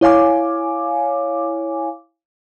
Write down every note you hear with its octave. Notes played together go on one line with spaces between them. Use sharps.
E4 C#5 F5 G#5 D6